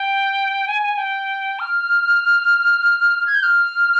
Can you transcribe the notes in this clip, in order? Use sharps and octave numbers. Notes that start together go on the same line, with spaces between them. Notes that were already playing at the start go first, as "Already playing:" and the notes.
Already playing: G5
G#5
G#5
G#5
G5
F6
G#6
G6
F6